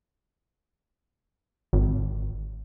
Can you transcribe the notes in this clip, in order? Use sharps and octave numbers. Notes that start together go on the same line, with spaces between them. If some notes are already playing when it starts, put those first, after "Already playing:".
G#1